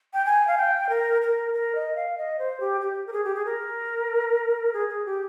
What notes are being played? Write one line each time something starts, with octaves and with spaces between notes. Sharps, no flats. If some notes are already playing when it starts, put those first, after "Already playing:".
G5
G#5
F5
G5
A#4
A#4
A#4
D#5
F5
D#5
C5
G4
G4
A#4
G#4
G4
G#4
A#4
G#4
G#4
G4